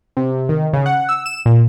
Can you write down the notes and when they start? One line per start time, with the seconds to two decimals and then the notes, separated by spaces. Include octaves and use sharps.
0.17 C3
0.49 D#3
0.73 C#3
0.86 F#5
1.09 E6
1.26 E7
1.46 A#2